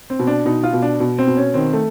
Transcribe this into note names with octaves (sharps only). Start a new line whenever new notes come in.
C4
B2
D4
B2 D#4
F4
B2
D4
B2
C4
B2
C#4
D#3 C4
A3